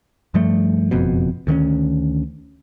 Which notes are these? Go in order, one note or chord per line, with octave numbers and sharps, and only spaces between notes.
G2 F3 G3 A3
F#1 F2 B2
D2 D#3 A3 C#4